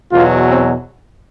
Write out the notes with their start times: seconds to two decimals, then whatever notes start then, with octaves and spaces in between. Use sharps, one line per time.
0.12 E2 B2 F#3 F4
0.49 C4